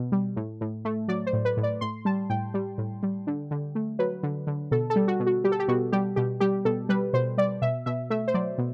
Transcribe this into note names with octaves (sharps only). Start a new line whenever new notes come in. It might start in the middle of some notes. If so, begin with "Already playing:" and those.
Already playing: B2
G3
A2
A2
A3
F#3 D5
C5
A2
B4
A2
D5
A2 C6
G3 A5
A2 G5
G3
A2
G3
D3
D3
A3
F#3 B4
D3
D3
B2 A4
A4
G3
F#4
B2
F#4
G3 G4
A4
G4
B2 F#4
G3 G4
B2 G4
G3 G4
B2 A4
G3 B4
B2 C5
G3 D5
B2 E5
B2 E5
A3 E5
C5
F#3 D5
B2